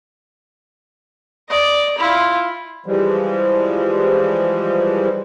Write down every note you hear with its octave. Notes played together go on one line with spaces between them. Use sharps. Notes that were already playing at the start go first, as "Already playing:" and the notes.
D5 D#5
E4 F4
E3 F3 G3 G#3